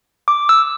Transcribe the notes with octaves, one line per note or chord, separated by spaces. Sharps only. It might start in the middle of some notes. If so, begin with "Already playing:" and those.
D6
E6